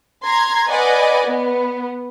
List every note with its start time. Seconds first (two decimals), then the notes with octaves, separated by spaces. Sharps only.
0.24 A#5 C6 G#6
0.68 B4 D5 D#5 F#5 G#5
1.26 B3